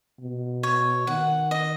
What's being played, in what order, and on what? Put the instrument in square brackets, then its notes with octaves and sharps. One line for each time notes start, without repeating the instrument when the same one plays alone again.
[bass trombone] B2
[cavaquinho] C#5
[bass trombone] D#3 [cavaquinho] F#5
[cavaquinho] D#5